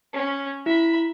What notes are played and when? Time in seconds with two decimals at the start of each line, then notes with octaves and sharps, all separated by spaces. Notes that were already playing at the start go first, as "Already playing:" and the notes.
0.13 C#4
0.66 E4 E5 B5